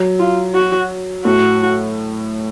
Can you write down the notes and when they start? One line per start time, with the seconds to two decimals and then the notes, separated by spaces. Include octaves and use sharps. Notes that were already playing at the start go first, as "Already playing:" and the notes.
Already playing: F#3
0.19 F4
0.54 F#4
1.25 A2 F#4